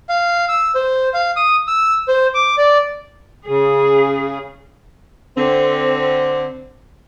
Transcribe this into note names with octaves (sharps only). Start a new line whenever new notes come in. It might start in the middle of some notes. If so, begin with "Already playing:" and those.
F5
E6
C5
F5
D#6
E6
C5
D6
D5
C#3 G#4
D3 C4